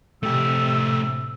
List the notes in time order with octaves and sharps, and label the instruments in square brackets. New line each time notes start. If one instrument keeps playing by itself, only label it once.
[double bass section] A2 C3 [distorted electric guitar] A3 G4 [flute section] E6